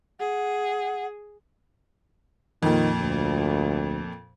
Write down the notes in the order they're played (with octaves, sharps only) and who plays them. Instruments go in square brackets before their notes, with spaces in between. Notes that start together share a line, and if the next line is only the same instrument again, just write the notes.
[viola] G#4 [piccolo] F#5
[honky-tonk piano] F2 A#2 [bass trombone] D#3
[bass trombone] D2